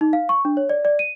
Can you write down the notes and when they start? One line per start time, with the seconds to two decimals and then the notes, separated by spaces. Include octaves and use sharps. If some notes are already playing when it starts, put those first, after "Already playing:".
0.01 D#4
0.13 F5
0.29 C#6
0.45 D4
0.57 C#5
0.70 D5
0.85 D5
0.99 D#7